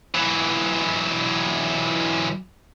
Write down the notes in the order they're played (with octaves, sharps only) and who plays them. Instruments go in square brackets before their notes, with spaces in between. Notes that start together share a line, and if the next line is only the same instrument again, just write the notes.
[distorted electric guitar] E3 F#3